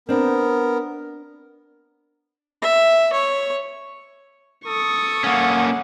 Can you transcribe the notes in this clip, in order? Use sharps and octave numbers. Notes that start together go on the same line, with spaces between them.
B3 C4 D4 A#4
E5
C#5
A4 C#6 D#6
A#3 C#4 F#5